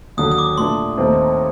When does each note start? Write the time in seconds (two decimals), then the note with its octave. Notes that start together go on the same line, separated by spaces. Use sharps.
0.17 D#2 D3 F#3 D#6
0.32 D#6
0.38 D6
0.57 A#2 A3 D4 C6
0.97 D#2 D#3 A3 C4